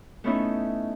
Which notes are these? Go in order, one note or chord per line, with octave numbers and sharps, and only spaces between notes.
A3 B3 C#4 D#4 E4